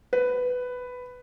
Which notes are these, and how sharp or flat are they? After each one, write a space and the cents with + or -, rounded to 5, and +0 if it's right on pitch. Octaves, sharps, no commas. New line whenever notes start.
B4 +10